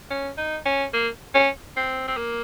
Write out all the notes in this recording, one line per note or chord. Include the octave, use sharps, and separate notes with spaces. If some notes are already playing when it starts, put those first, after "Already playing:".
C#4
D#4
C#4
A#3
C#4
C4
C4
A#3